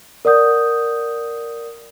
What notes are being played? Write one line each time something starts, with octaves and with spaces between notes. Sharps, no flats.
A#4 D5 F#5 D#6 G6